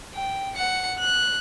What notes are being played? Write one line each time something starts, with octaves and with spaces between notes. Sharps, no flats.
G5
F#5 C#7
F#6